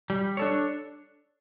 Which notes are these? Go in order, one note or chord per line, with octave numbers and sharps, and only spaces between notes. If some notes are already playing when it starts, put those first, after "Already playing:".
G3
D4 A4 C#5